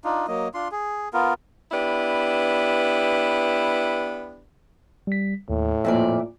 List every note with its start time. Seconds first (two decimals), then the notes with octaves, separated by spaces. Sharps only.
0.04 D4 D#4 F4
0.28 F#3 A#3 D#5
0.54 D4 F4 C6
0.71 G#4
1.13 B3 F4 A#4
1.72 B3 D4 E4 G4 B4
5.07 G3 B6
5.49 D#2 A2
5.85 F2 A#2 D5 E5